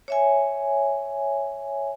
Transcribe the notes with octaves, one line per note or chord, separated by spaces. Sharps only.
C#5 E5 G#5